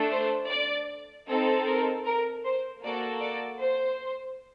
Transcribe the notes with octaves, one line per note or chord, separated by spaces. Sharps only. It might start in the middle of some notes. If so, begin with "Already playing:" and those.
Already playing: A3 D4 A4
C5
D5
C4 D#4 A4
A#4
A#4
C5
A#3 F#4 A4 D5
D5
C5